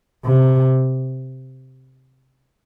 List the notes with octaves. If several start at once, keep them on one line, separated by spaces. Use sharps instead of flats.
C3